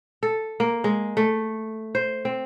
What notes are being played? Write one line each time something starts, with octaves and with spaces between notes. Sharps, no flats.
A4
A#3
G#3
A3
C5
C4